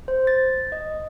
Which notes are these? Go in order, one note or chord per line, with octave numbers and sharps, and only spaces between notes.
C5
A6
D#5